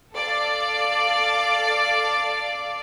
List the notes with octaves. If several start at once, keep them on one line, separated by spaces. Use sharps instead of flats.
A4 D5 F5